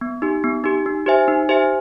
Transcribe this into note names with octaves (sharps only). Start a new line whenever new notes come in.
B3
D#4 G4
B3
D#4 G4
D#4
G4 C5 E5 G#5
D#4
G4 C5 E5 G#5